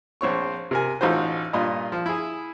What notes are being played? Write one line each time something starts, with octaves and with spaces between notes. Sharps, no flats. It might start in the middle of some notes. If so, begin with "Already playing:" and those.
A#1 C4 C#5 C#6
C3 A#4 G#5
A1 D#4 F4 F#4 C5
G2 A#2 F4 D#5 B5
F3
E4 G#4